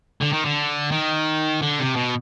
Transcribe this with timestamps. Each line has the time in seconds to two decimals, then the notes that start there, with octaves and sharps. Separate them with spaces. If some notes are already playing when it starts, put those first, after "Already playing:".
0.21 D3
0.32 D#3
0.45 D3
0.92 D#3
1.62 D3
1.80 C3
1.97 B2